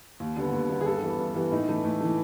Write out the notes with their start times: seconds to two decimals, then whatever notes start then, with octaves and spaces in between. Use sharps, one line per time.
0.20 D#2
0.37 D3 G3 B3
0.53 D#2
0.69 D3 G3 B3
0.81 G#4
0.86 G2 A4
1.02 E3 G3 B3
1.19 G2
1.35 E3 G3 B3
1.52 A2 D#4
1.68 E3 A3
1.84 A2
2.00 E3 A3